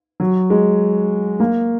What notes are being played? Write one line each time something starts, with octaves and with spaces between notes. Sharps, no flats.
F#3
G#3
A#3